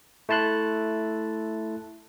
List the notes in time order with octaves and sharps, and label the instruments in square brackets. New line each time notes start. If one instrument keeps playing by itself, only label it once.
[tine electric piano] A3 E4 A5 C6 F#6